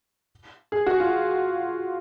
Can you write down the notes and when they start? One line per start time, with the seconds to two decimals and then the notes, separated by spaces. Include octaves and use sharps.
0.72 G#4
0.87 F#4
1.00 F4